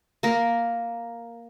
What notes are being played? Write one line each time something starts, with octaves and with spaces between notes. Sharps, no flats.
A#3 A#4